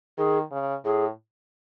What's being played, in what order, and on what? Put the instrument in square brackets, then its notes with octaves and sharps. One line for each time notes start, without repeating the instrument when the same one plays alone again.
[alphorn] D#3 [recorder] G#4
[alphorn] C#3
[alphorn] A2 [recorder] G#4